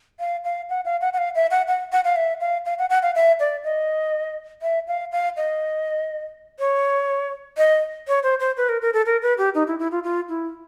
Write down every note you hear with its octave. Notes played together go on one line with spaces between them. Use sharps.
F5
F5
F#5
F5
F#5
F#5
F5
E5
F#5
F#5
F#5
F5
E5
F5
F5
F#5
F#5
F5
E5
D5
D#5
E5
F5
F5
D#5
C#5
D#5
C#5
C5
C5
B4
A#4
A#4
A4
A#4
B4
G4
D#4
E4
E4
F4
F4
E4